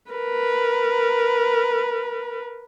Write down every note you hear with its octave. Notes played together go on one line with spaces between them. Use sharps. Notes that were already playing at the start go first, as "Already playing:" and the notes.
A#4 B4